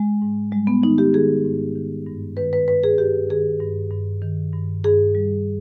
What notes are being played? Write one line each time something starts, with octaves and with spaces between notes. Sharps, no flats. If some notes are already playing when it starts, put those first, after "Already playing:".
Already playing: G#3
G#2
G3 G#3
B3
D#3 D#4
G4
D#3 G#4
G#2
D#3
G2
D#3 B4
B4
G2 B4
G#4
G2 G4
D#3 G#4
G2
G2
D#3
G2
G2 G#4
G3